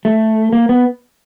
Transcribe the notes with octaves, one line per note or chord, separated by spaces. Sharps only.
A3
A#3
B3